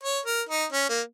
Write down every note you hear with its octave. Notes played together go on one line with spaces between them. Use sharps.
C#5
A#4
D#4
C#4
A#3